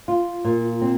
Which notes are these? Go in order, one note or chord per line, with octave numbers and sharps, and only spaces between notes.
F4
A#2
C4